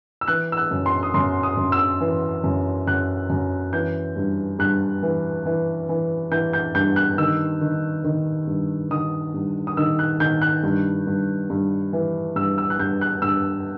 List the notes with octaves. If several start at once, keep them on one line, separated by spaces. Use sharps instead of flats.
E6
E3 F#6
E6
F#6
F#2
C6
D#6
F#2 C6
D#6
F#2
E6
E3
F#2
F#2 F#6
F#2
E3 G6
G2
G2 F#6
E3
E3
E3
E3 G6
G6
G2 G6
F#6
D#3 E6
D#3
D#3
G2
D#3 D#6
G2
D#6
D#3 E6
F#6
D#3 G6
F#6
G2
G2
G2
E3
G2 E6
E6
F#6
G2 G6
F#6
G2 E6